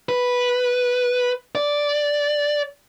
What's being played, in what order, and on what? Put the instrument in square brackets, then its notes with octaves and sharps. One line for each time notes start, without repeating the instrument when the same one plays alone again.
[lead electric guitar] B4
D5